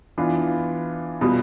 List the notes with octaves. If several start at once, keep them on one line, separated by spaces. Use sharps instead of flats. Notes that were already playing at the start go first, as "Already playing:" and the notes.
E3 B3 D4 F4
B2 G3 B3 F4